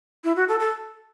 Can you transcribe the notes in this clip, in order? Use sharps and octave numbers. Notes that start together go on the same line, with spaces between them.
E4
F#4
A4
A4